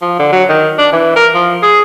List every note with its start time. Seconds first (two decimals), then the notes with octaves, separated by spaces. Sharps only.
0.02 F3
0.19 D3
0.32 F#3
0.49 D#3
0.78 D4
0.93 E3
1.16 A#4
1.35 F3
1.62 G#4